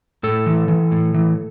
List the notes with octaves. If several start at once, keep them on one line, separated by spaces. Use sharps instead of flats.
A2 A4
E3
E3
A2
E3